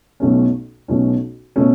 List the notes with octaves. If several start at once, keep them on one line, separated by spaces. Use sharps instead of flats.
B1 B2 A3 C#4
B1 B2 A3 C#4
B2 A3 C#4